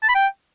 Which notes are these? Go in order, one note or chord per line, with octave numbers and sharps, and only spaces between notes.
A5
B5
G5